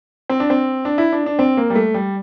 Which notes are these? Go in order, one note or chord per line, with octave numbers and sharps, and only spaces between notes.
C4
D4
C4
D4
E4
D4
D4
C4
A#3
G3
A3
G3